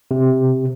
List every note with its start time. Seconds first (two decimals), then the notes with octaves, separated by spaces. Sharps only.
0.11 C3